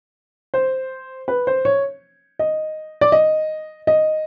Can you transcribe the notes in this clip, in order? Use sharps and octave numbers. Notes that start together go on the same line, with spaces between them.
C5
B4
C5
C#5
D#5
D5
D#5
D#5